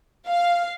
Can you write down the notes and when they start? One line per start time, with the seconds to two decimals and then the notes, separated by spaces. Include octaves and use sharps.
0.27 F5